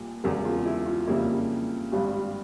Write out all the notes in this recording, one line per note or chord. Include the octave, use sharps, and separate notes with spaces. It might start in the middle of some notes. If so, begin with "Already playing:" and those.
Already playing: C2 A#2 G3
E1 E2 C#3 A#4
F4
E4
F4
F2 C#3 G3 A#3 E4
G#1 G2 G3